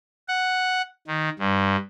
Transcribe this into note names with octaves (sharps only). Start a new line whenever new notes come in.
F#5
D#3
G2